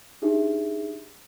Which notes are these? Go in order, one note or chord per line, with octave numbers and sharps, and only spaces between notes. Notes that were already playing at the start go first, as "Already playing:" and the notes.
D4 D#4 G4 G#4 E5